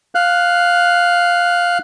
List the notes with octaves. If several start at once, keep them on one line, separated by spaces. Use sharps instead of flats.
F5 F#6